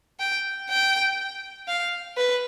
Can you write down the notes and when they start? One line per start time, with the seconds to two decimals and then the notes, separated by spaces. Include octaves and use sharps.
0.20 G5
0.70 G5
1.68 F5
2.17 B4